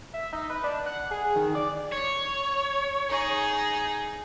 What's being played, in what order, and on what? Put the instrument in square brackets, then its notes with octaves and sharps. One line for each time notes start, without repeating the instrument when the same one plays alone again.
[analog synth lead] E5
D#4
B4
D4
F#5
G#4
D#3
D5
[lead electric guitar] C#5
[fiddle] D#4 G#4